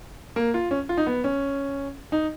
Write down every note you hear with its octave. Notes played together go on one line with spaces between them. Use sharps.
A#3
F4
C#4
F4
D#4
B3
C#4
D#4